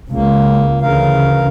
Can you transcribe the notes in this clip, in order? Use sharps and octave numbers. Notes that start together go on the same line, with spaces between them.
C#2 A#3
D2 C#3 E3 A#4 F5